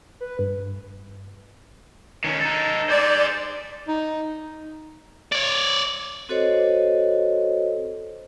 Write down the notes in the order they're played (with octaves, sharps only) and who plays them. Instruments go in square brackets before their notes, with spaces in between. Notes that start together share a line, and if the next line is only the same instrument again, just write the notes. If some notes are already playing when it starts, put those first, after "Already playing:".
[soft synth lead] B4
G2
[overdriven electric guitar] D#3 C#4
D#4 A4
[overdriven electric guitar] G#4 C5 [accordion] D5
[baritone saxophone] D#4
[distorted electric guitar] C#5 D5
[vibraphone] C4 F#4 A4 C5 C#5 D#5